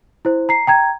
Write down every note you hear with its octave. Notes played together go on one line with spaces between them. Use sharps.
E4 C5
A#5 C7
G5 A#5 G#6